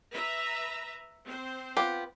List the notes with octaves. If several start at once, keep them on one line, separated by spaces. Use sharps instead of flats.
B4 E5 A#5
C4 C5
B3 F4 G4